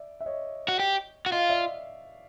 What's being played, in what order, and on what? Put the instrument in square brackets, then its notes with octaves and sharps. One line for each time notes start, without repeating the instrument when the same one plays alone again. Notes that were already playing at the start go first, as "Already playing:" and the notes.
Already playing: [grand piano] D5 E5
E5
C#5 D#5
[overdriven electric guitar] F#4
G4
F#4
[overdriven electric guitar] F4 [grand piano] D#5 F5
[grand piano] D5 E5